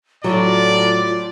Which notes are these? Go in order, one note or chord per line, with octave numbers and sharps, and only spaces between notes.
A2 F#3 F4 D5